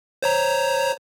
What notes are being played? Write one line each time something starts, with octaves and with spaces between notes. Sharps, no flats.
C5 C#5 A#5